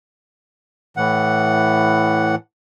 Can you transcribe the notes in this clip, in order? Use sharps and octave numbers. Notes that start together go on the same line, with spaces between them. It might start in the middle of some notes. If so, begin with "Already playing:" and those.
A2 E3 F#5